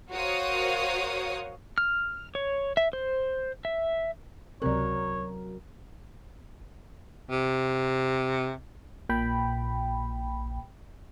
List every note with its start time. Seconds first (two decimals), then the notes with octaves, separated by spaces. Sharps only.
0.10 F#4 A#4 C5 C#5 F5 D#6
1.78 F6
2.35 C#5
2.77 E5
2.93 C5
3.65 E5
4.62 C#2 C3 F#3 C4 A#4 C#5 D5 F#6
7.31 C3
9.09 A#1 A#2 G5 B5